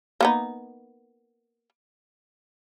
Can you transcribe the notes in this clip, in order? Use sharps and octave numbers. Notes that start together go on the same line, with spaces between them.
A#3 B3 D#4